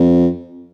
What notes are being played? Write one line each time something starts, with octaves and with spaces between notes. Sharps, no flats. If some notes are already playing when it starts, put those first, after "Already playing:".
Already playing: F2